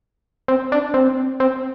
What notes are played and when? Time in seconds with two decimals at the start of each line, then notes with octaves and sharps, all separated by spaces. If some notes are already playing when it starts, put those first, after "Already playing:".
0.48 C4
0.72 D4
0.94 C4
1.40 C4